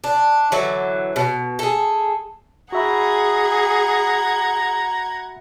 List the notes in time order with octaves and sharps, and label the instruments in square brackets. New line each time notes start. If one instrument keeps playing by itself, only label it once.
[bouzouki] D4
D3 E3 F#3
B2
G#4 A4
[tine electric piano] F#4 E5 B5 [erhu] G#4 [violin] F#5 G#6 [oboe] A#5